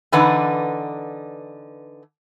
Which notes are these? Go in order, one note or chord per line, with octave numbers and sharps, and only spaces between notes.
D3 E3 D4 D#4 B4 F#5